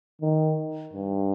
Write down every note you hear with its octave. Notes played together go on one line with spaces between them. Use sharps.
D#3
G2